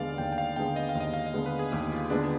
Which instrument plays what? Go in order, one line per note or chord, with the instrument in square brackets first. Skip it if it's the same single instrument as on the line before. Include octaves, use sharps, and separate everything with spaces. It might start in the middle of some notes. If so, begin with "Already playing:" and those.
Already playing: [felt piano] D#2 D3 G#3 B3 [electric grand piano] D5 F5
[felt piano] D#2 [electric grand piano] G5
[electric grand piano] G5
F5
[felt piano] D3 G#3 B3 [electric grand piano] G5
[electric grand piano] D#5
F5
[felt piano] D#2
[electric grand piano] D#5
F5
D#5
[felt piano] D3 G#3 B3
[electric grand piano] B4
G#4
[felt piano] D#2 [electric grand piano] G4
[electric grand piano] F4
[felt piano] D3 G#3 B3 [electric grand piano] D4
[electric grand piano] D4